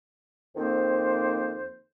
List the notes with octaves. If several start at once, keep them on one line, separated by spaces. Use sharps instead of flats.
F2 D#3 A#3 C4 C5